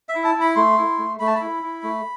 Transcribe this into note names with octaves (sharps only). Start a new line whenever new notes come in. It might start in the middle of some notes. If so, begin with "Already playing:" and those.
E5
E4
A5
E4
B5
A3 C6
E4
A3
A3 B5
A5
E4 B5
E4
A3